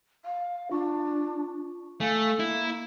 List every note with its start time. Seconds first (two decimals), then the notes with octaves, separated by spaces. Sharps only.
0.25 F5
0.71 D4 F4 C#6
2.01 A3 F5 G#5
2.40 A#3 E4 F5